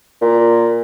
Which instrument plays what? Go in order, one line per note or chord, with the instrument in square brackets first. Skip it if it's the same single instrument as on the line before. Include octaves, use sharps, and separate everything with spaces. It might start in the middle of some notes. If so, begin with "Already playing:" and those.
[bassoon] A#2